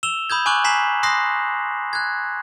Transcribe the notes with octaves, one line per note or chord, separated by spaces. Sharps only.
E6 E7 F7 G7
B5 D#6 G6 G#6
G#5 C#6 D6 F#6 F#7
G#5 A#5 B6 C7 E7 F#7
C6 D#6 F#6 A#6 C7
F#6 G#6